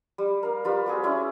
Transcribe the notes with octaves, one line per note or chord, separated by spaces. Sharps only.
G3
A#4 F5
G3 F4 B4
C4 F#4 G#4
C#4 E4 D5